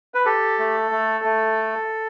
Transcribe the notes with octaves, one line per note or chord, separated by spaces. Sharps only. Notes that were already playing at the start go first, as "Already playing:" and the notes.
B4
G4 A4
A3
A3
A3